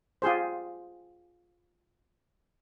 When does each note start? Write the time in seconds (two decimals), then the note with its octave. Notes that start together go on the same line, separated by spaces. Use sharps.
0.22 F4 G4 G#4 C5